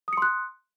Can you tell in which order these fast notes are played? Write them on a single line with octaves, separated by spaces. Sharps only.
D#6 C#7 C6 F#6